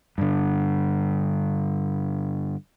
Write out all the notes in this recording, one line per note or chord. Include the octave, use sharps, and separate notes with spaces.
G2 D3